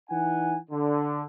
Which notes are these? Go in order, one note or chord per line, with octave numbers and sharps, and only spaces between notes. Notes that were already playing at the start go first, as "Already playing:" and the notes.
E3 D#4 F#5 G#5
D3